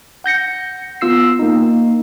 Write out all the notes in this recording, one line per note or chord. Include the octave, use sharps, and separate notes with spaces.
F#5 G6 A#6 C#7
B3 F4 E6 C7
A#3 D#4